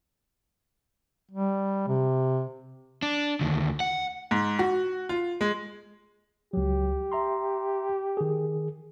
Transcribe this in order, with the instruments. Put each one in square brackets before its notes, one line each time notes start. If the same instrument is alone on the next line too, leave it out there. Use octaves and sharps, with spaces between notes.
[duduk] G3
C3
[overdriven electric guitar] D4
D2 D#3
F#5
[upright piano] G#2
F#4
F4
G#3
[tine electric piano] C#2 F#3 [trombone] G4
[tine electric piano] E5 A#5 C6
D#3 G#4